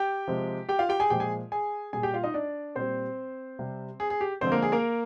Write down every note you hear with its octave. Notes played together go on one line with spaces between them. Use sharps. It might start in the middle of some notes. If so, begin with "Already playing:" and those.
Already playing: G4 G5
C3 F3 G#3
G4 G5
F4 F5
G4 G5
G#4 G#5
A#2 F3 G#3 G4 G5
G#4 G#5
G#4 G#5
A#2 G3 G#4 G#5
G4 G5
F4 F5
D#4 D#5
D4 D5
A#2 G3 C4 C5
C3 G3
G#4
G#4
G4
D3 F3 G#3 C4 C5
A#3 A#4
G#4
A#3 A#4